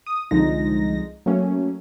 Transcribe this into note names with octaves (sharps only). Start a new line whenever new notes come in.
D#6
C2 D3 F3 G#3 D#4 A#6
F#3 A3 A#3 C#4